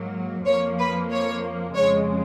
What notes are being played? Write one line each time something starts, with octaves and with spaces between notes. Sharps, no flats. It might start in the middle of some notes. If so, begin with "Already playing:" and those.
Already playing: G#2 F#3 A#3
F2 F3 A#3 C#5
B4
C#5
F2 C#3 G#3 C#5